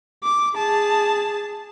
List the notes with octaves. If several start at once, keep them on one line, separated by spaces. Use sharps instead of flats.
D6
G#4 A5